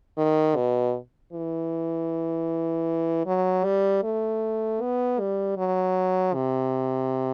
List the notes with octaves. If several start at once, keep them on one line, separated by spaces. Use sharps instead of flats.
D#3
B2
E3
F#3
G3
A3
B3
G3
F#3
C3